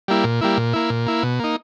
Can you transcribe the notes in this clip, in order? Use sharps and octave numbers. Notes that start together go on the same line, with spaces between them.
G3 A#3 E4
A#2
G3 A#3 E4
A#2
A#3 E4
A#2
A#3 E4
B2
A#3 D#4